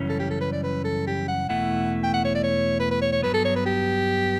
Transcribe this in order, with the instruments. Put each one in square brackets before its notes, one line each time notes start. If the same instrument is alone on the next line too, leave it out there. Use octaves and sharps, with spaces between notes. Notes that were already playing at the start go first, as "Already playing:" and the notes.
Already playing: [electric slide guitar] F#2 C#3 E3 G3 C#4
[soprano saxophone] A4
G4
A4
B4
D5
B4
A4
G4
F#5
[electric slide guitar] E2 B2 A3 E4 [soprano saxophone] F#5
[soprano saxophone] G5
F#5
C#5
D5
C#5
B4
B4
C#5
C#5
[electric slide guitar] G2 F#3 B3 [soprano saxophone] B4
[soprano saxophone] A4
C#5
B4
G4